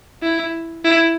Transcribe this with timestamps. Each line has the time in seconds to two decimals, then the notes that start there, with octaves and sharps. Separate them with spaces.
0.22 E4
0.85 E4